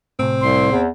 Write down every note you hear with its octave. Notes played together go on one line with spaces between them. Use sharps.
A2 C3 C4
C2 C6
E2